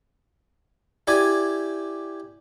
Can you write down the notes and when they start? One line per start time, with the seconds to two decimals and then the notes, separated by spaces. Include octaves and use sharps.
1.07 E4 G4 D5 G#5